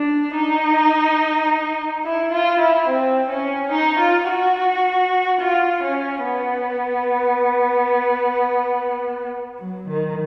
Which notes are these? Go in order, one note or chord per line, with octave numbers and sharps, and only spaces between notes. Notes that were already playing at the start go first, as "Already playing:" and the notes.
Already playing: D4
D#4
E4
F4
E4
C4
C#4
D#4
F4
F#4
F4
C#4
B3
F#3
D#3